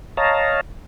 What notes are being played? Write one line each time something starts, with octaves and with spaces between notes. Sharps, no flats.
C#5 D#5 F5 A5 A#5